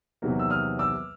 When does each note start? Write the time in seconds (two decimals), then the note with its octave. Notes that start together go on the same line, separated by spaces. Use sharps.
0.22 E2 C3 D#3 F#3 A#3
0.39 E6
0.50 D#6 F6
0.79 D6 E6